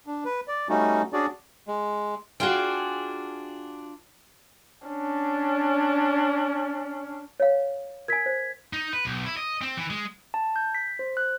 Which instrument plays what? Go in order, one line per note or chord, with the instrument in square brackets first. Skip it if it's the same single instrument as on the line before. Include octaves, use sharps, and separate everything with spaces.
[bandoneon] D4
B4
D5
G3 A3 C#4 D#4 F#4
C#4 D4 F#4 G#4 D5
G#3
[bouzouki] D4 F4 G#4 [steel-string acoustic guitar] F#4 G5
[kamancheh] C#4 D4
[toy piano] C#5 F5
[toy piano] A#4 G#5 [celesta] G#6 B6
[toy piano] C5
[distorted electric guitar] D#4
B4
B1
E4
D#5
C4
E3
G#3
[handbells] A5
G6
B6
C5
F#6